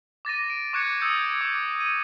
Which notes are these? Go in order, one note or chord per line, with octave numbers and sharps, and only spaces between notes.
D6 A6 A#6 D#7
D7
C#6 D6 F#6 G#6 C#7
D#6 E6 G6 G#6 C#7
D6
D#7